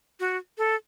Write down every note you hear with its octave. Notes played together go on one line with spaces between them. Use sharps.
F#4
A4